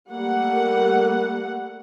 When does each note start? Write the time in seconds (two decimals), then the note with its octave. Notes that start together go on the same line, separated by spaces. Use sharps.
0.10 G3 A3 A#3 F#5